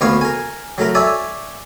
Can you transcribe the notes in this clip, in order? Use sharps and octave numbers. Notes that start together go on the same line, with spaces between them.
D2 A#3 B3 C#5 F5 C#6
A#4 G#5
F#3 A3 A#4
C#5 D5 E5 G#5 A5